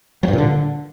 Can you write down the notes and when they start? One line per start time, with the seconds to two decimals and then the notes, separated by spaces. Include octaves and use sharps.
0.23 F#3
0.28 G2
0.33 A#2
0.38 D3